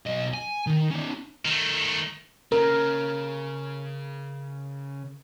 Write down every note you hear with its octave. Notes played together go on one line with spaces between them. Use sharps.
B1 D#5
G#5
D#3
C#4 D#4
D#3 A3
C#3 A#4